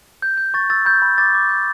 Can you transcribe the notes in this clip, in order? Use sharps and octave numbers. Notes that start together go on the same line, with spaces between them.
G6
G6
C#6 A6
E6 A6
B5 G6
B5
D6 A6
D6
G6